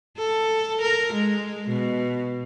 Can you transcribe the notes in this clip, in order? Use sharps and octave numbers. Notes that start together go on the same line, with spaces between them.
A4
A#4
G#3
B2